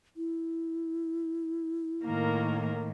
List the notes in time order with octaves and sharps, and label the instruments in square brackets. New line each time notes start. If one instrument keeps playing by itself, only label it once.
[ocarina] E4
[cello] A2 D#3 [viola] A#3 A#4